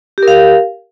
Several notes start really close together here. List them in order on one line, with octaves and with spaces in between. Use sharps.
G4 A#4 F5